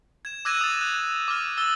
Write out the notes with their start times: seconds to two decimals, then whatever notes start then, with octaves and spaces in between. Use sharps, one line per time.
0.25 G#6 E7
0.45 D6 E6 F#6 G#6 A#6 D#7
0.61 D#6 A6
0.81 F#6
1.28 D6 F6
1.58 E6 A6 G7